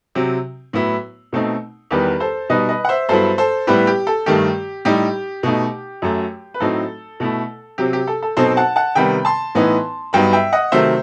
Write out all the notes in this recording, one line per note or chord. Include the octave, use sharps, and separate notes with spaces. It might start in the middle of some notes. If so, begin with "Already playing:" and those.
C3 F#3 C4
A2 F#3 B3 E4
B2 A3 C4 D#4
E2 D#3 G3 B3 G4 B4
A4 C5
B2 G3 D#4 B4 D#5
B4 D#5
F#5
C5 E5
G2 F#3 B3 E4 A4 C5
A4 C5
A2 G3 B3 E4 G4 B4
G4
A4
G2 D#3 A3 G4
A2 G3 D#4 G4
B2 A3 D#4
F#2 F#3 A3
B4
A2 F#3 A3 C4 D#4 A4
B2 A3 E4
C3 F#3 C4 G4
G4
A4
A4
B2 F#3 C4 D#4 A4 C5
F#5 A5
F#5 A5
C3 D#3 G3 B3 G5 B5
A5 C6
A2 E3 B3 D#4
G2 F#3 B3 D#4 G5 B5
E5 G5
D#5 F#5
C3 D#3 F#3 A3 C5 E5